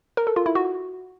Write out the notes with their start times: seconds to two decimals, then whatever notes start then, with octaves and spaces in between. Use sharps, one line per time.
0.17 A#4
0.27 A4
0.36 F4
0.46 E4
0.55 F#4